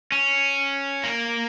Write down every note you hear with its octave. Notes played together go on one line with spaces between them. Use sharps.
C#4
A#3